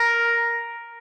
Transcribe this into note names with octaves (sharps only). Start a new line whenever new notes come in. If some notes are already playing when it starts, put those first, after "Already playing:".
Already playing: A#4